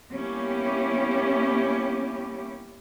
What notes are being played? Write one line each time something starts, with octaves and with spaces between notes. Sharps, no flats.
G3 A#3 B3 C#4 E4 G4